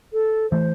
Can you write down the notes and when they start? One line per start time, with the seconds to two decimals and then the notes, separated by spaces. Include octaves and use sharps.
0.12 A4
0.50 E3 A3 C5